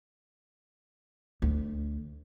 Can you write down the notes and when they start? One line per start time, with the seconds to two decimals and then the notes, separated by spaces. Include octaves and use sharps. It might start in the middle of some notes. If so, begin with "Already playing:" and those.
1.42 D2